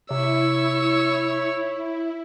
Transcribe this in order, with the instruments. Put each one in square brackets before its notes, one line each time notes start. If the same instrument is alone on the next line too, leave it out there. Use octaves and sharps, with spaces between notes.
[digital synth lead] C3 [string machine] E4 [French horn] C#5 [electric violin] C#6 E6